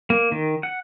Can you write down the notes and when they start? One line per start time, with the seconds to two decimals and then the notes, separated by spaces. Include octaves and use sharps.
0.10 A#3
0.32 D#3
0.63 F#5